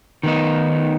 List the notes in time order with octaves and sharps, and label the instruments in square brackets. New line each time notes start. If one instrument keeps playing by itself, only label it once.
[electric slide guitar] D#3 B3 D#4